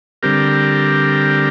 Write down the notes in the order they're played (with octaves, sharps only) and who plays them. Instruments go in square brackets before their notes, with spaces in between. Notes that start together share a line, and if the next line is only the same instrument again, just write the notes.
[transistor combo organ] D3 G3 C4 G4 A#4